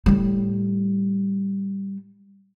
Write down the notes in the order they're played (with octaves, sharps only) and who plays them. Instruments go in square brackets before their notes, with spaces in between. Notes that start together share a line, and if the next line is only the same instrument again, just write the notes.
[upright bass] A2 G3